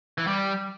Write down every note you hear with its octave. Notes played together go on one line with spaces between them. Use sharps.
E3
G3